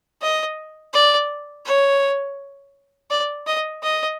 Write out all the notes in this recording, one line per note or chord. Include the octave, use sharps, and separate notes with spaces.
D#5
D5
C#5
D5
D#5
D#5